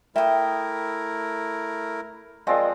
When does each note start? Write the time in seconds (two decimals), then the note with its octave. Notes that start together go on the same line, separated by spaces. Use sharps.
0.16 A3 E4 A#4 E5 G5 D#6
2.47 F3 G#3 C4 A#4 D5 D#5